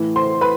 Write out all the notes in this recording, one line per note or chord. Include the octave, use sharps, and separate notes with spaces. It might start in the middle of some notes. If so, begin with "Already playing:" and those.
Already playing: A2 E3
C5 C6
B4 B5